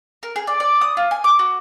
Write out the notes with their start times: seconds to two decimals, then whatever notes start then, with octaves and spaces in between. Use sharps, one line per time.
0.23 A#4
0.36 G#4
0.47 D5
0.60 D5
0.81 D#6
0.97 F4
1.11 G#5
1.24 D6
1.39 F#4